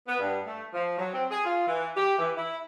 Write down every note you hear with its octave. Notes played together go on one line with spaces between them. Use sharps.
B3
G2
A3
F3
F#3
C4
G#4
F4
E3
G4
E3
E4